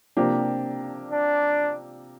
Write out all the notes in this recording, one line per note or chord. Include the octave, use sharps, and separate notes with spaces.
C3 F3 A#3 D4 G4
D4